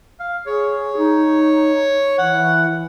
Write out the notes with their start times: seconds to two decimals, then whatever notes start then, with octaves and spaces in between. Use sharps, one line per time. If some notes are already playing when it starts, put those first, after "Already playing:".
0.20 F5
0.47 G#4 C#5
0.97 D#4
2.18 E3 F#5